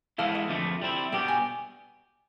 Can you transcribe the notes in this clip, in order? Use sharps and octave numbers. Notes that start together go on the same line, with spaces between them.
E3 G#3 B3 E4 A4 F5
D#5
F2 D3 F3 A3
G3 C4 E4
B2 G3 B3 D4 G4 G5
G#5